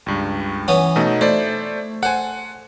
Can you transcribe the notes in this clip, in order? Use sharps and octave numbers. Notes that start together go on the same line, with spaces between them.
C#2 G2
E3 B3 C#4
B2 A3 D#4
A3 E4 C5 D5
A4 C5 F#5 G#5